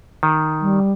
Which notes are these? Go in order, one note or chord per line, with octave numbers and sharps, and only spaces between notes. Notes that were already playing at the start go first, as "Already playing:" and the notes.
D#3
G3